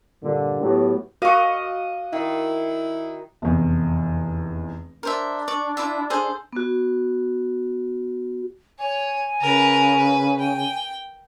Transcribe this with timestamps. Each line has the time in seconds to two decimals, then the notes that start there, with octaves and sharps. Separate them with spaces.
0.23 G2 A#2 D3
0.62 A2 F#3 B3 G4
1.22 F#4 D#5 F5 F#5 C#6
2.13 D#3 E4
3.42 F1 E2
5.03 D4 A#4 C5 E5
5.48 D5 C#6
5.77 E4 F4 E5
6.10 G#4 A4 C5
6.53 B3 F#4
8.79 C#5 G#5
9.41 C#3 A#4 B4
9.96 B4
10.39 G5